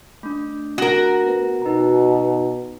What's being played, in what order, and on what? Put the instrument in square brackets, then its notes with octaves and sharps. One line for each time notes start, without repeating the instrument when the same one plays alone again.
[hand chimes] A3 D4
[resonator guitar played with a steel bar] F#4 A#4
[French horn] B3
[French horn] B2 [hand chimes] D#4 A#5